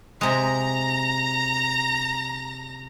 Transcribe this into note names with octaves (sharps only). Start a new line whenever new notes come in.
C3 G#3 A#5 A#6